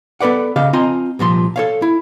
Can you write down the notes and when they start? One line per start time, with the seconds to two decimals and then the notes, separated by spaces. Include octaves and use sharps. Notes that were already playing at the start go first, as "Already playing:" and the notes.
0.20 B3 A4 B4 D5 F#5
0.56 C#3 G4 D#5 F5
0.73 C4 F4 D#5 G#5 A#5
1.19 C2 A#2 F3 C6
1.56 A4 C#5 F5
1.82 E4